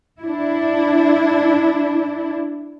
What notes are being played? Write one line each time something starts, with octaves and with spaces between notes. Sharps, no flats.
D4 E4